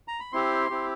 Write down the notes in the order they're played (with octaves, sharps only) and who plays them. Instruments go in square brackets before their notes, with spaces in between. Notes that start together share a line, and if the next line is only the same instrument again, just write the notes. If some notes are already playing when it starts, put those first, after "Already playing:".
[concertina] A#5
B5
C4 E4 G4 C6
C4 E4 G4